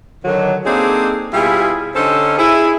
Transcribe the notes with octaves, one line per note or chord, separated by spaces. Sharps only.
D3 D#3 F#3
A#3 C4 D4 D#4 G#4 A4
B2 G3 E4 F4 G#4
D3 C#4 D#4 A4 C5
E4 G#4